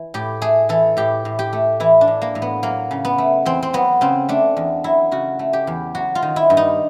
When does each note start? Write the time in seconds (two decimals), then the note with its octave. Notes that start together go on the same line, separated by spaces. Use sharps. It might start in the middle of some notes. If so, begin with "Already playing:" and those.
Already playing: E3
0.14 A2 G4
0.42 A3 G#4
0.69 E3 A4
0.97 A2 G4
1.25 A2
1.39 G4
1.53 A3
1.80 E3 E4
2.01 D4
2.07 A2
2.22 A#3
2.35 A2
2.42 B3
2.63 F#3 A#3
2.91 C#3
3.05 B3
3.18 A3
3.45 E2 C4
3.63 C4
3.73 F#3 B3
4.01 C#3 C4
4.29 A3 D4
4.57 E2
4.84 F#3 E4
5.11 C#3 F#4
5.39 A3
5.53 G4
5.67 E2
5.95 F#3 F#4
6.15 F4
6.22 D#3
6.36 E4
6.50 G2
6.57 D#4